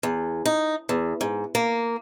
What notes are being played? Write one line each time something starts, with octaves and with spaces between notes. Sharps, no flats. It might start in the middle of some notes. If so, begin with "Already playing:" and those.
E2
D#4
E2
G#2
A#3